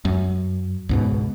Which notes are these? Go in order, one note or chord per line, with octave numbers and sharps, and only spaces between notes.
F#2
C#2 G#2 B2